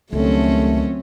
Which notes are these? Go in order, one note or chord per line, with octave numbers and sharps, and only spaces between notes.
C#2 D#3 F#3 G3 A3 C4 C#4